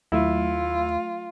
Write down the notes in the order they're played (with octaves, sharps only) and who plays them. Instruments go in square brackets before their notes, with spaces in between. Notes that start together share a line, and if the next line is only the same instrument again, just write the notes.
[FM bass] D#2 [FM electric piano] F#3 A3 [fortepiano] E4 [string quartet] F4